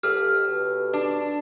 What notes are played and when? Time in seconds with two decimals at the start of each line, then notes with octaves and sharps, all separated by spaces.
0.03 C#2 G4 A4 F6
0.48 B2
0.93 D4